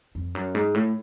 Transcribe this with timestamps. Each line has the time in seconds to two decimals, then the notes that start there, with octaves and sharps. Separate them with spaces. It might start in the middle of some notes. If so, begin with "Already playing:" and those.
0.15 F2
0.35 F#2
0.55 G#2
0.74 A2